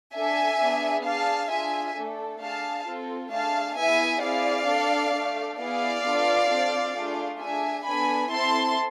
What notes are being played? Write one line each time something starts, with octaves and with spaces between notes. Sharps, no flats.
D4 A4 E5 G#5
B3 D4 G#4
D4 G#4 F5 A5
D4 F4 G#4 E5 G#5
A3 D4 A4
D4 G#4 F5 A5
C4 F4 A4
A3 D4 G#4 F5 A5
B3 E4 G#4 E5 G#5
C4 E4 G#4 D5 F5
D4 A4
A3 D4 A4
B3 E4 G#4 D5 F5
B3 D4 F4 A4
C4 F4 A4
A3 D4 F4 G#4
D4 G#4 E5 G#5
B3 D4 A4 G#5 B5
C4 E4 A4 A5 C6